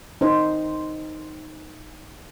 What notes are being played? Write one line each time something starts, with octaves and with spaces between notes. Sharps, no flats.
D#4 C5